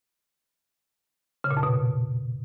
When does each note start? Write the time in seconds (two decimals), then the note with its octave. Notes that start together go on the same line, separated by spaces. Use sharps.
1.44 C#3
1.51 A#2
1.57 F2
1.63 B2